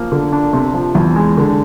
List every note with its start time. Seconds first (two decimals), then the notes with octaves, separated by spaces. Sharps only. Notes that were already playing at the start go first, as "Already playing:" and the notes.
Already playing: F3 A#3
0.12 D3
0.32 D4
0.53 C3
0.74 F3
0.95 E2
1.16 G#3
1.37 D3